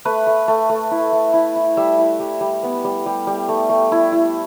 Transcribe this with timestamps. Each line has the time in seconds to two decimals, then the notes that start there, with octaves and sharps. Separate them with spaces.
0.05 A3 B4
0.27 A3
0.48 A3
0.69 A3
0.91 E4
1.13 A3
1.33 E4
1.56 E4
1.77 G3 E5
1.98 E4
2.20 G3
2.41 G3
2.63 B3
2.84 G3
3.06 G3
3.27 G3
3.48 A3
3.69 A3
3.92 E4
4.12 E4